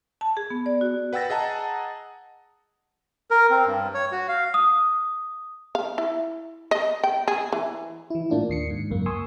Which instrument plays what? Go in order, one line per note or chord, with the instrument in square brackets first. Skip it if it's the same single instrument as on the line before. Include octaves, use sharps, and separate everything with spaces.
[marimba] A5
G#4
B3
D5
F#4
[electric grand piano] B4 F#5 G5 E6 A6 A#6
G#4 D#5 F#5 A5 A#5
[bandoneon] A#4
C4
G2
C#5
F#4
F5
[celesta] D#6
[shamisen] F5
E4
D#5
G5
G#4
E3
[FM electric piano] E3 E4
A2 A#3 D4 F4
D#2 C7 C#7
G#2
C#2 F#2 A#3
G#5 C6 C#6 D#6 E6